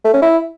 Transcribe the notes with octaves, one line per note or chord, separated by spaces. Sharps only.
A3
C#4
E4